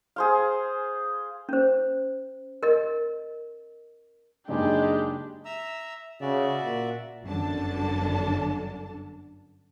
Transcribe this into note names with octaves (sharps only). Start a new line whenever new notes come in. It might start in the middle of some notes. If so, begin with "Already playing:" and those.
G#4 C5 F5
C#4 C5
A#4 D#5
F#1 G#3 D4 D#4 G4
E5 A#5 E6
C#3 F#4 D5 E5
A#2
G1 F#2 D3 D4 A4 A5